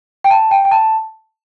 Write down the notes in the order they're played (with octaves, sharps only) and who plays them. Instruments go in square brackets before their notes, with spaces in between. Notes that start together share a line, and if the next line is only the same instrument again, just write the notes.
[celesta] G5
A5
G5
G5
A5